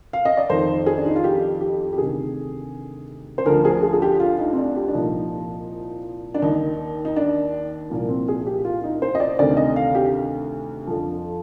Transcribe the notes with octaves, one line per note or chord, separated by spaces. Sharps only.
F5
D#5
D5
F2 D#3 C5
G#4
D4
D#4
F4
G4
G4
G4
D2 C3 D#3 G#4
C5
D2 D3 F3 A#4
G#4
G#4
G#4
G4
F4
D#4
C4
D4
G4
D4
C2 A#2 F3 D#4
D4
D#2 D#3 D#4
D#4
D4
C2 A#2 F3 A#3
C4
G#4
G4
F4
D#4
C5
D#5
D5
D2 C3 D#3 D5
D#5
F5
G4
F2 D3 F3